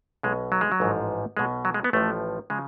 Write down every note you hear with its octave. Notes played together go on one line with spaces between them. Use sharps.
B1 B2 G#3
F#3
G#3
F#3
A1 G#2 F3
B1 B2 G#3
F#3
G#3
B3
A1 A2 F3 A3
C#3 F3 G#3